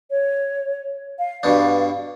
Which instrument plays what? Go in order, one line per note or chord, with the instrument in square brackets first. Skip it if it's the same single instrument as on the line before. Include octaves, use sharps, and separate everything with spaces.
[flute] C#5
F5
[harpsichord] G2 B2 D4